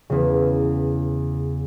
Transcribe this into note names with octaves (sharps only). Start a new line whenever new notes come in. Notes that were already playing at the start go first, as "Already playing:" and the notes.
E2 C#3